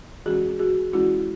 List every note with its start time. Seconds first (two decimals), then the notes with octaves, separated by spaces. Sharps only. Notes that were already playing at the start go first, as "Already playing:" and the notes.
0.26 E3 G#3 C#4 F#4 G#4
0.59 F#4 G#4
0.93 E3 G#3 C#4 E4 F#4